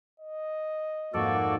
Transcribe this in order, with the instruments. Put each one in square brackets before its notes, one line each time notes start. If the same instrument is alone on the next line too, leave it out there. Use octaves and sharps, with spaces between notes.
[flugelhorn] D#5
[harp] F2 G#2 D#4 [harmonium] A#3 F#4 [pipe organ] A4 D5